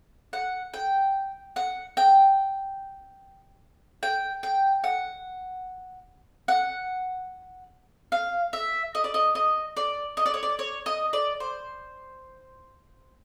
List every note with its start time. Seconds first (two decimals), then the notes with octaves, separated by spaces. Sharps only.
0.33 F#5
0.74 G5
1.56 F#5
1.97 G5
4.03 G5
4.43 G5
4.84 F#5
6.48 F#5
8.12 F5
8.53 E5
8.95 D#5
9.04 D5
9.14 D#5
9.35 D#5
9.77 D5
10.17 D#5
10.26 D5
10.34 C#5
10.43 D5
10.59 C#5
10.86 D#5
11.13 D5
11.40 C5